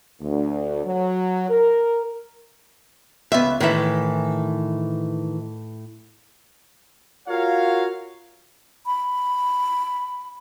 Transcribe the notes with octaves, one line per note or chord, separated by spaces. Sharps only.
D2
F#3
A#4
C#2 B3 E5
A2 D#3 E3 E5
F4 F#4 A#4 C#5 F5
B5